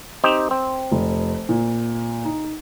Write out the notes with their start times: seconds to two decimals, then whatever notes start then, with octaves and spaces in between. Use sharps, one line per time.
0.24 C4 D#4 G4
0.51 C4
0.91 F1
1.49 A#2
2.25 D#4